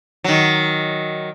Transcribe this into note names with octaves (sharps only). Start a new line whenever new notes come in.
D#3 F#3